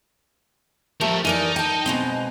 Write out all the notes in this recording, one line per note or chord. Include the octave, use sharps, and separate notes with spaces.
F3 A3 G4 A#4 E5
E3 D#4 A#4 D5
G5 A5
B2 G#3 C4